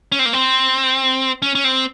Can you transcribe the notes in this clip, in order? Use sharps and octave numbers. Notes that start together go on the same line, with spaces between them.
C#4
C4
A#3
C4
C#4
C#4
C4